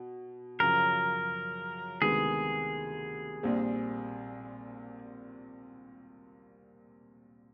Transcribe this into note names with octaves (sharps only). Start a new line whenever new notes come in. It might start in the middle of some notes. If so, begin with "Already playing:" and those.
Already playing: B2
F#2 C#3 F3 A#4
D2 C3 D#3 G#3 B3 G#4
A#1 A#2 G3 C4